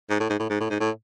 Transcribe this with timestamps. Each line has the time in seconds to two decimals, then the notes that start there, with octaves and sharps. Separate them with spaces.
0.10 G#2
0.20 A2
0.30 G#2
0.40 A2
0.50 G#2
0.60 A2
0.70 G#2
0.80 A2